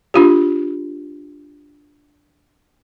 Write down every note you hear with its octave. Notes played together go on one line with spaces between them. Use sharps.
D4 F4 G4